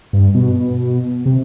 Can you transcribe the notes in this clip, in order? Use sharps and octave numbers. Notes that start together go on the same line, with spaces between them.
G2
B2
C3